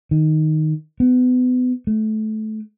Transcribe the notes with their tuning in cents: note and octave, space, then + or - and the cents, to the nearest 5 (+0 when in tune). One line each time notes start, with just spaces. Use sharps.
D#3 +0
B3 +30
A3 -20